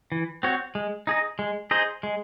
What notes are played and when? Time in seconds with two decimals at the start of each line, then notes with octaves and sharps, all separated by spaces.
0.12 E3
0.43 C4 F#4 C#5
0.75 G#3
1.07 D#4 G#4 D#5
1.39 G#3
1.71 D#4 G#4 C5 D#5
2.03 G#3